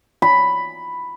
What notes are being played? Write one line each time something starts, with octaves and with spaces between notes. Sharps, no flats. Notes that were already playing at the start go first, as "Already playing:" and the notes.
B5